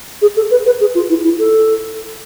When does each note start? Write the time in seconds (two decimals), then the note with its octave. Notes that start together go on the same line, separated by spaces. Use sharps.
0.22 G#4
0.36 A4
0.51 B4
0.66 B4
0.81 G#4
0.95 F4
1.10 E4
1.24 E4
1.39 A4